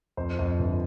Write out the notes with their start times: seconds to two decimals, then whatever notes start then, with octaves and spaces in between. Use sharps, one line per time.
0.17 F2 C5
0.39 F2
0.59 G1